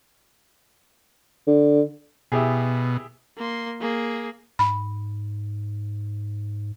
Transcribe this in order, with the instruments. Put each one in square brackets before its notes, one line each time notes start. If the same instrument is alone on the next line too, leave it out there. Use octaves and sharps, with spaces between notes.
[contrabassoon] D3
[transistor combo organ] B2 [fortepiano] E4 G4 G#4
[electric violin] A#3 C6
A#3 G#4
[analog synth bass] G#2 [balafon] B5